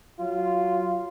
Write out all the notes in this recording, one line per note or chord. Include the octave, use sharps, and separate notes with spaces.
F#3 F4